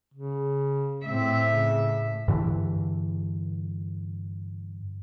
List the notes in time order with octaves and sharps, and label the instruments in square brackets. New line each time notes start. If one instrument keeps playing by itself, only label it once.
[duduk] C#3
[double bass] A2 [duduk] C4 [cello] E5
[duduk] C#3
[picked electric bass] G2 D3 E3